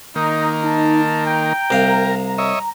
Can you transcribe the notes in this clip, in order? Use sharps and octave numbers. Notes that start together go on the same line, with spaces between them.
D#3 A#3 D#4
D#4 A5
G5 A#5
C2 A#4 F5
C#5 D#5 E5